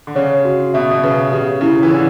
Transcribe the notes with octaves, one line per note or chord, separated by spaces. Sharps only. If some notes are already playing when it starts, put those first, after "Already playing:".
D3
C#3 C#5
F#4
B2 E5
B2
C#3 B4
C#3 G4
C#3 E4
E3
D3 C#5